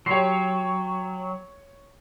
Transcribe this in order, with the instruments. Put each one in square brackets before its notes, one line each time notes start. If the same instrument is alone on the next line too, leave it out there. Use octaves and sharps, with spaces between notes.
[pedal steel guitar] F#3 [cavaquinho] G4 C6 [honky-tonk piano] C#5 C7